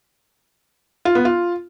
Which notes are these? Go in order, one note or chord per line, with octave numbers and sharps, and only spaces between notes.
F4
B3
F4